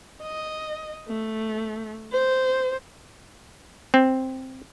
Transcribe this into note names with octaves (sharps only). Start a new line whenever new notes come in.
D#5
A3
C5
C4